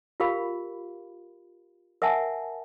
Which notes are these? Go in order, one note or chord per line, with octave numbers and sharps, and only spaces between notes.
F4 G4 A#4 F5 B5
A#4 E5 F#5 G#5 A5